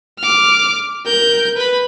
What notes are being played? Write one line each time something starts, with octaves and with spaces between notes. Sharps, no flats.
D6 F6
A#4 G6
B4 B5